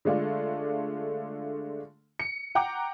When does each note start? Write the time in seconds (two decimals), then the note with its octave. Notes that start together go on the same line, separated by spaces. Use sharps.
0.05 D3 G#3 A3 D4 F4
2.19 C#7
2.55 F#5 G5 A#5 D6